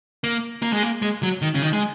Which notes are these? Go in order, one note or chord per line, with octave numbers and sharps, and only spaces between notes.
A#3
A#3
G#3
A#3
G#3
F#3
D#3
C#3
D#3
G#3